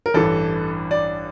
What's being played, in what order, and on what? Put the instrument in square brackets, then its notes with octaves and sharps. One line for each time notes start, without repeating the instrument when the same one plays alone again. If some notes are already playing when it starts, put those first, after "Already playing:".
[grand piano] A#4
A1 G2 E3 A4
D5